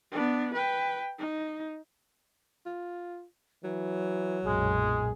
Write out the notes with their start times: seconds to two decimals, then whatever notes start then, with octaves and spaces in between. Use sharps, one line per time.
0.12 B3 D4
0.55 B4 G5
1.19 D#4
2.66 F4
3.64 E3 F#3
4.45 B1 F#2 A#2 G#3 G#4